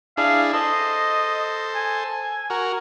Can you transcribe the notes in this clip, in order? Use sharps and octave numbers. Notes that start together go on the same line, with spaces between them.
D4 E4 G#4 F5
A4 C5 D#5
G#5
F#4 A#4